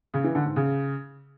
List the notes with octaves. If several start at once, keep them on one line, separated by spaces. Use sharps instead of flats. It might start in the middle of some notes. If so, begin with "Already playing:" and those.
C#3
E3
D3
G#2
C#3